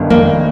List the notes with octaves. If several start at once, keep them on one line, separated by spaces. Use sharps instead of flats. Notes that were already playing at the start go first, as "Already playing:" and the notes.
Already playing: G1 G2 D#3
A#3